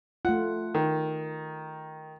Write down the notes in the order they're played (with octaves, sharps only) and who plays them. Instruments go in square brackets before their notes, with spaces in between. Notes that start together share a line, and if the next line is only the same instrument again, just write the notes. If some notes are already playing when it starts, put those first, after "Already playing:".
[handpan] A3 F4 [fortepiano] F#5
[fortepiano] D#3